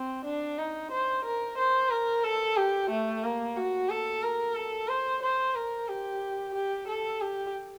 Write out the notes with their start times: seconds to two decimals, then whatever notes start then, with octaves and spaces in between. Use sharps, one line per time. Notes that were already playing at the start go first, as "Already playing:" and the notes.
Already playing: C4
0.25 D4
0.59 D#4
0.91 C5
1.25 A#4
1.58 C5
1.90 A#4
2.24 A4
2.57 G4
2.91 A3
3.24 A#3
3.57 F#4
3.89 A4
4.23 A#4
4.55 A4
4.88 C5
5.23 C5
5.55 A#4
5.89 G4
6.55 G4
6.88 A4
7.21 G4